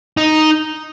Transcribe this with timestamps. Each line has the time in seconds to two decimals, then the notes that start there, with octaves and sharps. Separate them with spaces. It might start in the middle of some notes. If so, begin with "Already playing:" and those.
0.17 D#4